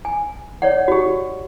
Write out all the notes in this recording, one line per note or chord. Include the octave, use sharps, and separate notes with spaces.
G#5
C#5 D5 F#5
F#4 G4